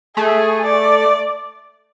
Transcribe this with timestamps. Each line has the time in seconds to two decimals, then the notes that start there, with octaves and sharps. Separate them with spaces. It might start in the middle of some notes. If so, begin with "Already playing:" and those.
0.17 A3 G#4
0.65 D5